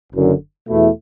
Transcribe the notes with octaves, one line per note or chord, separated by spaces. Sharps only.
F#1 F#2 D3
E2 B2 A3 E4